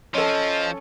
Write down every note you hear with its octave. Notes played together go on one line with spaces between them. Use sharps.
F3 C#4 A4 D#5